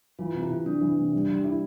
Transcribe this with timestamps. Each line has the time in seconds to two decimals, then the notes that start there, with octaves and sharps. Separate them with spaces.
0.19 E3 F4
0.34 C3
0.43 E4
0.50 C3
0.66 E3 D4
0.81 E3
0.97 C3
1.13 G3
1.29 G3
1.44 E4